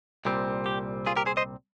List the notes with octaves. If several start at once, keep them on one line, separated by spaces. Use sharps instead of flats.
C2 A#2 G3 C4
G4
F4 G#4
G4 A#4
G#4 C5
C5 D#5